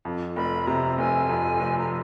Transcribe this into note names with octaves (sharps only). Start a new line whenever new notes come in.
F2
F1 B5
C3 A#5
F1 G#5
F2
F1
A#5